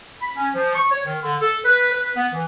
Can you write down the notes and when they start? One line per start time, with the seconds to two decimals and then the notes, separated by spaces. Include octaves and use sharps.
0.21 B5
0.36 C#4
0.54 F3
0.75 C#6
0.90 C#5
1.05 D#3
1.22 D3
1.41 A4
1.65 B4
1.93 B4
2.16 B3
2.33 E3